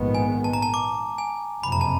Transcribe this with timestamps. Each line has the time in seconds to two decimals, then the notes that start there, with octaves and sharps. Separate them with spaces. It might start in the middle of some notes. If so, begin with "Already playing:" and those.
Already playing: A#1 G#2 D#3 G#3 B3
0.15 G#5
0.44 A5
0.53 A#5
0.62 A5
0.74 D6
1.18 G#5
1.63 F#1 F2 C3 B5
1.72 A#5
1.81 A5